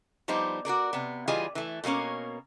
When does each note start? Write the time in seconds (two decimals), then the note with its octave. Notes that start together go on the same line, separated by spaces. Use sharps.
0.28 F3 G3 B3 D#4 C5
0.65 F#4 G#4 A#4 D5
0.93 C3 B3
1.28 E3 G3 F4 G#4 D#5 G#5
1.55 E3 A3
1.84 B2 F3 A#3 C#4 C#5